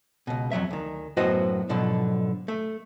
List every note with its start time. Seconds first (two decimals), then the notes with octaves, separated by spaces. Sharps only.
0.27 C#2 B2
0.52 F2 D#3 F#3 E5
0.71 D2 D#3
1.17 F#2 A2 B3 F#4 C5 D#5
1.69 G#2 B2 D3 F3 F#3
2.48 A3